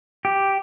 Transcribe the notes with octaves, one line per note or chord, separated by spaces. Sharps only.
G4